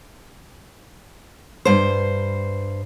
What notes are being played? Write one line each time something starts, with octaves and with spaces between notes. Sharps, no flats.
G2 C5